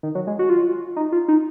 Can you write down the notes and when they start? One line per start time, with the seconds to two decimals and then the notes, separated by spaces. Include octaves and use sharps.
0.03 D#3
0.15 F#3
0.27 G#3
0.39 F#4
0.50 F4
0.96 D#4
1.12 F4
1.28 D#4